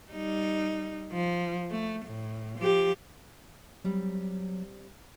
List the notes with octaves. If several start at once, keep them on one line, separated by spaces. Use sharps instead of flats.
G3 D#4
F3
A3
A2
F3 G4
F#3 G3 C4